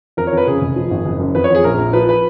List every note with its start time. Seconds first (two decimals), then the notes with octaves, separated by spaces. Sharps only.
0.17 F2 A#4
0.27 C#5
0.32 F2 B4
0.47 C#3 G#4
0.61 F1
0.76 F3
0.91 G#1
1.05 F#1
1.20 F#2
1.35 F2 B4
1.44 C#5
1.50 F2 G#4
1.64 A#1 A#4
1.78 A#1
1.93 F3 B4
2.09 B4